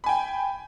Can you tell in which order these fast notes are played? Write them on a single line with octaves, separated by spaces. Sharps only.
B5 G#5 G5